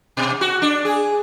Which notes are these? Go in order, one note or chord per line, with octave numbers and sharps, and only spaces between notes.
B2
F#4
D4
G#4